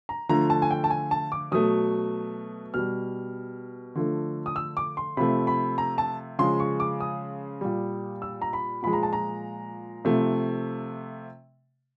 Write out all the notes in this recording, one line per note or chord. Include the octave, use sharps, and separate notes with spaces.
A#5
D3 F3 A3 A#5
A5
G#5
G5
A5
G#5
A5
D6
B2 F#3 A3 D#6
B2 G3 F6
D3 F3 A3
D#6
E6
D6
C6
C3 F3 A3 B5
B5
A#5
A5
C#3 F3 G#3 C6
C#6
D6
D#6
A#2 G3
E6
A#5
B5
A#2 F3 G#3 B5
A#5
A5
A#5
C3 F3 A3